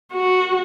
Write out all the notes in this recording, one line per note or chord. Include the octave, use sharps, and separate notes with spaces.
F#4